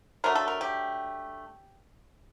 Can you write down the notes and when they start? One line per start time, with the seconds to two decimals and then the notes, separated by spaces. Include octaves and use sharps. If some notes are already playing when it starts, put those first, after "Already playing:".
0.24 D3 F#3 A3 A#4
0.35 A4
0.48 A#4
0.61 G4